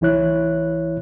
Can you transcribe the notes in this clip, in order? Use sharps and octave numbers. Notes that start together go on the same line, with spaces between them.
C2 E3 E4 C#5 F#6